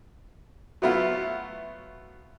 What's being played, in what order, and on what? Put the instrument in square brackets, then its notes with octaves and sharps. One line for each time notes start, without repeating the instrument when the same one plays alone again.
[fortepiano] F#3 A3 B3 E4 F4